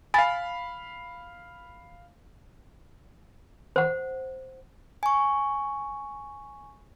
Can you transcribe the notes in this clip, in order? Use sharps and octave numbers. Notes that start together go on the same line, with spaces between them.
F5 G#5 B5 A6
C5 F#5
G#5 C#6